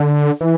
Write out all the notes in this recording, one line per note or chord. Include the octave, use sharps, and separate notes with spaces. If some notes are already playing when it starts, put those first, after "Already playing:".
Already playing: D3
E3